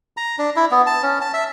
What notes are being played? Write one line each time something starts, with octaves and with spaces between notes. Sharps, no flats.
A#5
D4
E4
B3
A5
C#4
A5
E5